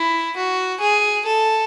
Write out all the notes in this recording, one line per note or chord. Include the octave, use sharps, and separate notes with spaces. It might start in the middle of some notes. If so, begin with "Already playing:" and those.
Already playing: E4
F#4
G#4
A4